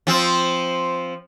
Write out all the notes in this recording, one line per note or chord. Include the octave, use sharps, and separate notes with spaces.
F3 C4